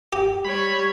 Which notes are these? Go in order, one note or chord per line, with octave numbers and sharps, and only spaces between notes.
G4
G3 C#5 B5